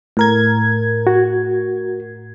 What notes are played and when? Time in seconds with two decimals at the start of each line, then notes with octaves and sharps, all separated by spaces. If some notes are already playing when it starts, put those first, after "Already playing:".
0.17 A2 A#4 G#6
1.07 F#4